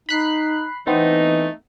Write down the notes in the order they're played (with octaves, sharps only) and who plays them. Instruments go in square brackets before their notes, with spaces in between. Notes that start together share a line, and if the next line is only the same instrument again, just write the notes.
[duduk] D#4 [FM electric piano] B5 F#6 C7
[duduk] E3 [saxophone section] A3 D#4 [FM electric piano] B3 C4